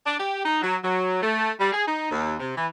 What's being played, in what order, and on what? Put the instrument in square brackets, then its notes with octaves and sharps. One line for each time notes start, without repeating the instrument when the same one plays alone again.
[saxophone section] D4
G4
D#4
F#3
F#3
A3
G3
G#4
D#4
D#2
C3
E3